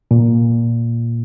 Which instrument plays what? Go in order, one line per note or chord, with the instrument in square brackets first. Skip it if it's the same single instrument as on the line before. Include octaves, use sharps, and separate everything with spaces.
[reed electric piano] A#2